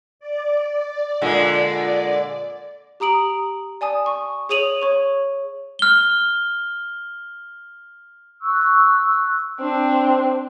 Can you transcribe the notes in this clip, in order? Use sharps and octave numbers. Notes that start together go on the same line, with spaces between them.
D5
A#2 D3 G#3
G4 A#5 D#6 D7 F#7
D5 G#5 A5 D#6
C#6
G#4 C#5 D#6 D#7 F7 F#7
C#5 C#6
F6 G7
C#6 E6 F#6
C4 D4